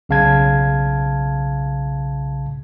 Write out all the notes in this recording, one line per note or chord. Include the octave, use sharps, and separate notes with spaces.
B1 C#3 F5 A5 G#6